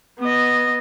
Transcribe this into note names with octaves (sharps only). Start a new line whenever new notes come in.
B3 D#5